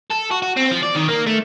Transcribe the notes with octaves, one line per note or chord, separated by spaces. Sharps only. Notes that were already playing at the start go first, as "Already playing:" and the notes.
A4
F#4
F#4
C4
F3
D5
D#3
A#3
A3